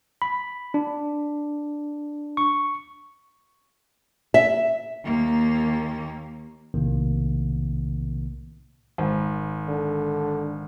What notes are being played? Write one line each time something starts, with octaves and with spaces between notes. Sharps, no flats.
B5
D4
C#6
E5
D#2 A#3
B1 A2 C3 D#3 A#3
G#1
D3